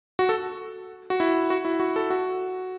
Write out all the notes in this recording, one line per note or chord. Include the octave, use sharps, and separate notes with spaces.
F#4
A4
F#4
E4
F#4
E4
F#4
A4
F#4